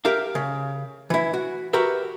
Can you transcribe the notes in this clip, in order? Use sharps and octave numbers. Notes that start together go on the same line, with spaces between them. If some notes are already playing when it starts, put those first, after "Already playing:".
G4 A#4 E5 F5
C#3
E3 E4
F#4
F#4 G4 A#4 B4 E5